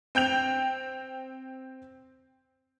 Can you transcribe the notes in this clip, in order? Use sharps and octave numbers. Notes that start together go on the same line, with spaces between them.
C4 G5 G6 F7